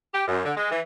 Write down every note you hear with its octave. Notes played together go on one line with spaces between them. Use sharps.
G4
F#2
D3
G#3
E3